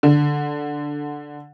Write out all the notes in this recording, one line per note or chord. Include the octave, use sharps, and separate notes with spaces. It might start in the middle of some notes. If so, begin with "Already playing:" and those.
D3